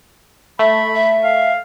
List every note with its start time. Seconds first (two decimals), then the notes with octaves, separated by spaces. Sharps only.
0.59 A3 E5 B5
0.94 E5
1.24 F5